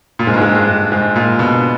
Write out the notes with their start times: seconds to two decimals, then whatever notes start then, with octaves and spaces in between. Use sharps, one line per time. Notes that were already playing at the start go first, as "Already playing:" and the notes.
0.19 A#2
0.27 G#2
0.34 G2
0.41 G#2
0.55 G2
0.92 G#2
1.16 A#2
1.39 B2